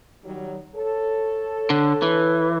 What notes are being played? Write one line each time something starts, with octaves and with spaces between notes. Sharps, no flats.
D#3 F#3 G3
A4 C#5
D3
E3